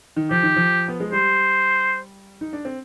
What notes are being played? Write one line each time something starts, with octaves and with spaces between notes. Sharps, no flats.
D#3
F3 G4
D#3
F3
B3
G#3
G3 C5
D#4
D4
C4